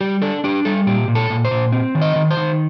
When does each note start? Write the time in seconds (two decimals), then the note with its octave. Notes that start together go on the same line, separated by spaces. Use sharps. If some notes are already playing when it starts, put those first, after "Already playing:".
0.01 G3 G4
0.22 D4 A4
0.44 D4 G4
0.65 G3 A4
0.87 A#2 G4
1.08 A#2
1.15 A4
1.30 A#2
1.45 C5
1.51 A#2
1.72 C4
1.95 D#3
2.01 D#5
2.16 D#3
2.31 C5
2.37 D#3